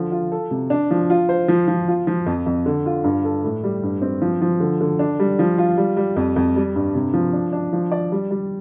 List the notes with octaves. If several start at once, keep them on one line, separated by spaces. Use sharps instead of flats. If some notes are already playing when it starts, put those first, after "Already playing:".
Already playing: D3 F3
F4
A4
C3
D4
F3
F4
C5
F3
F3
F4
F3
F2
F2
D3
F4
G2
A4
A2
G3
G2
C4
F3
F3
D3
D3
D4
G3
F3
F4
G3
G3
F2
F2
G3
G2
C3
F3
D4
D4
F3
D5
G3
G3